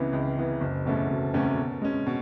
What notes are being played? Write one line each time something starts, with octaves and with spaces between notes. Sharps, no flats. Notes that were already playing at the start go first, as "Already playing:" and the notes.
Already playing: C#2 C#3 E3 B3
C#2
C#3 E3 B3
F#1
E2 B2 A3 C#4
F#1
E2 B2 A3 C#4
B2
G#3 C#4
B2